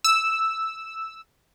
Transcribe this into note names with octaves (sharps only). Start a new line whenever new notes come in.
E6